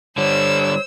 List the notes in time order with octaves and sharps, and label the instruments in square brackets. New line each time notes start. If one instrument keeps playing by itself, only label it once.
[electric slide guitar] D3 G3 [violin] C5 E6 [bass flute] C#5